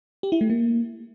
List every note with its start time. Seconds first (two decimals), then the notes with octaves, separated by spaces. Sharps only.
0.23 G4
0.32 E4
0.41 A3
0.50 A#3